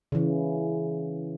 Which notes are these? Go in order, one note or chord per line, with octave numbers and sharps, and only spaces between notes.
C#3 E3